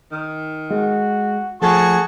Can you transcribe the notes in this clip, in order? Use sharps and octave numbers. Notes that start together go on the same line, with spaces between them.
D#3
G#3 F#4
F3 A3 F#4 G#4 A4 C#6 G#6